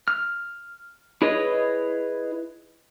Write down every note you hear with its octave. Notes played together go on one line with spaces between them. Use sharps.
F6
E4 G#4 B4 C#5 D#5